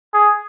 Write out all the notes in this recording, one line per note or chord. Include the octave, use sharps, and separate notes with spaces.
G#4